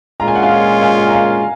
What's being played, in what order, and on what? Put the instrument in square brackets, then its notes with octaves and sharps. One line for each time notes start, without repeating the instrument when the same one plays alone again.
[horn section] A#2 G#3 C#4 F4 [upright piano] A#5
[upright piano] G#5
F#5
F5 G#5
F5 G#5
A#5
F5 G#5